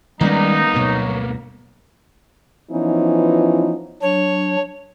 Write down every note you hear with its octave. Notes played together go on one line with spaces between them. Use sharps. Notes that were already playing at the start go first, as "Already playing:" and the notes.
D#3 G3 G#3 A#3 B3 C#4 D#4
D2 G2 B2 F#3
E3 F3 B3 C#4 D#4 F4
F#3 D4 C#5